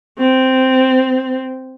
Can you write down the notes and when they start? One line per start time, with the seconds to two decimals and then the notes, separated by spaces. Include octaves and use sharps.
0.19 C4